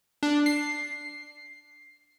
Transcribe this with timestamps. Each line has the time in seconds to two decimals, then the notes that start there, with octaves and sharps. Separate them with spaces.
0.23 D4
0.46 C7